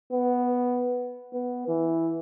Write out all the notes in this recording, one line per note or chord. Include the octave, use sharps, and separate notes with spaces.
B3
B3
E3